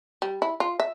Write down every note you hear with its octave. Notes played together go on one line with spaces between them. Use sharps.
G3
E4
F4
E5